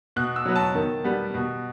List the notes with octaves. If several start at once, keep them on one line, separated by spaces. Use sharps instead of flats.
B2 F#6
E6
F#3 B3
A5
D#3
G3 B3
B2